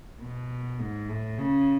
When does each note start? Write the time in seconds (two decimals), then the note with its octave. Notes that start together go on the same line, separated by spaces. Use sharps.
0.21 B2
0.80 G#2
1.09 A2
1.38 C#3